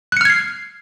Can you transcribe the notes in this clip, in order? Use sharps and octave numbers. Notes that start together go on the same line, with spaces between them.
F6 F#6 G#6 C7 C#7